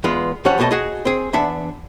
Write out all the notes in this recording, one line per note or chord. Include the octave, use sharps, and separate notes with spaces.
E2 G#3 B3 F4
F2 F3 G3 C#4 C#5 F#5
B1 B2 A3 G4 D#5 A5
F#4 G#4 D#5
C4 G#4
E2 D4 E5 F#5 A5